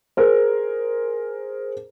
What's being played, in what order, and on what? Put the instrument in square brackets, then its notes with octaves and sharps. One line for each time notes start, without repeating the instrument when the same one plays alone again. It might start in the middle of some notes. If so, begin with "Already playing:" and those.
[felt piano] G#4 A#4 C5